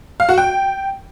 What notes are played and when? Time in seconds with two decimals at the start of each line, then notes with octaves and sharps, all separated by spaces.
0.20 F5
0.29 F#4
0.38 G5